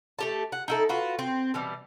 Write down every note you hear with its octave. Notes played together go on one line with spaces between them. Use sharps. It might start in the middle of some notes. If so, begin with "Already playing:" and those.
A3 G4 A5
F#5
D#4 E4 A4
F4 F#4 B4
C4
B2 E3 G3